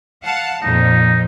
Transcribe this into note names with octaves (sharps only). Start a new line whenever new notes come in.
F5 F#5 A5
F2 A#2 D#4